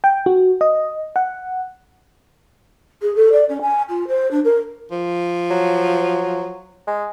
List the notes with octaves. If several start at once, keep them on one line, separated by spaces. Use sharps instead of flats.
G5
F#4
D#5
F#5
G#4
A4
D5
C#4
G#5
F4
C5
D4
A#4
F3
F#3
G#3